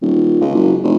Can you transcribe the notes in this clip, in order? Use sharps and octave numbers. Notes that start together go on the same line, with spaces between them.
D#1
C#2
F#1
F1